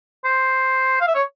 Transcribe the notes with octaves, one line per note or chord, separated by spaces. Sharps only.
C5
F5
E5
C#5